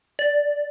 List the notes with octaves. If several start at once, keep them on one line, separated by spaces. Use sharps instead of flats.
D5